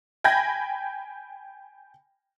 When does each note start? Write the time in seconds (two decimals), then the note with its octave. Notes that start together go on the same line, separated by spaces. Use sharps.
0.24 G5 G#5 B5 G6 G#6 A#6